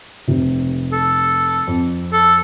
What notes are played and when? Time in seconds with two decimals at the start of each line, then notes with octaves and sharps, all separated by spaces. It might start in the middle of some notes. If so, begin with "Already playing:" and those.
0.27 F1 C3
0.93 A4
1.68 F2
2.13 A4